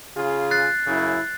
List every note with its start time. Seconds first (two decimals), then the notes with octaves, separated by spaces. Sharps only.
0.16 C#3 F4 G#4
0.51 F#6 A6 C7
0.86 F#2 C#3 E4